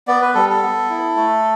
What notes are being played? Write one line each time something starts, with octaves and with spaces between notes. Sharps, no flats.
B3 D5
B4
G3 A4
A4
B3
E4
A3